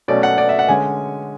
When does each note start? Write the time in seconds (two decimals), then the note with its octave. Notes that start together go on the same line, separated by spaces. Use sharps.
0.08 B2 F#3 A3 C#4 D5
0.23 F#5
0.38 D5
0.49 E5
0.59 F#5
0.68 D3 G#3 C#4 G#5